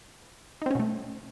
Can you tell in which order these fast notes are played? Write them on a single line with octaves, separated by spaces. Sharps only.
D#4 C4 C#4 B2 A3